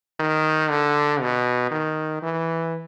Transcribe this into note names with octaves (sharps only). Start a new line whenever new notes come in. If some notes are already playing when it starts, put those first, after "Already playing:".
D#3
D3
B2
D#3
E3